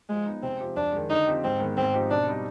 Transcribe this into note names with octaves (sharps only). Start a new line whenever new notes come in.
F3 G#3
B3 D#4
C3 C4
F3 C4 G4
F2 D4
D#3 G#3
D3 D#4
F3 C4 G4
G#2 C4
D#3 G#3 B3
G#2 C4
F3 C4 D#4 G4
B2 D4
G3 C4 D#4 G4